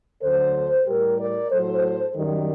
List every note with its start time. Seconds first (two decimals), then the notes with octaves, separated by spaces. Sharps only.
0.22 D2 D3 F#3 A4 C5
0.86 A2 G3 G4 A#4
1.18 A#4 D5
1.50 A2 F#3 A4 C5
2.15 F#2 D#3 G3